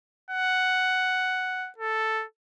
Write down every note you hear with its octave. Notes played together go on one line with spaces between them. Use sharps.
F#5
A4